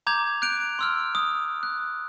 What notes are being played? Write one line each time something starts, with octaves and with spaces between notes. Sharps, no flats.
A#5 D6 G6 G#6 F7
F#6 G6 D7 F7
C6 E6 F6
D#6
F#6